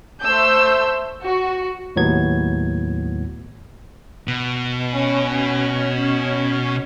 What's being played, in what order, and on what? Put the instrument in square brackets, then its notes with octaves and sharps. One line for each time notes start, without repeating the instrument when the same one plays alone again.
[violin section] A3 C5 A5 E6 G6
F#4
[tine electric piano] D#2 A2 F#3 B3 G#6
[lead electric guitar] B2
[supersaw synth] C#4